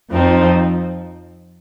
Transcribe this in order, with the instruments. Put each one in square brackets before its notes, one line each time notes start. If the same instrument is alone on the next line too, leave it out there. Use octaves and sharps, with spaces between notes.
[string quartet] F2 F3 C4 D#4